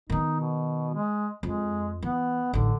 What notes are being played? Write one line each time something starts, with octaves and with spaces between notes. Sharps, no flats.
D#3 B3 D#4
B2
G#3
F2 G#3
E3 B3
A1 D3 D#4